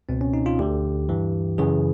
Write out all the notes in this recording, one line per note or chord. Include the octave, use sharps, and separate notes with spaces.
C#2 B2 C4
C#4
D#4
F4
D2 D3 G4
G2 E3
F#2 C#3 E3 G#4